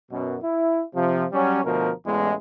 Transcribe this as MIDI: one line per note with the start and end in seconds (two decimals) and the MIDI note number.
0.11 0.36 42
0.11 0.36 47
0.43 0.83 64
0.95 1.24 48
0.95 1.24 53
1.32 1.60 54
1.32 1.60 55
1.32 1.60 61
1.64 1.91 38
1.64 1.91 47
1.64 1.91 53
1.64 1.91 70
2.06 2.32 33
2.06 2.32 40
2.06 2.32 56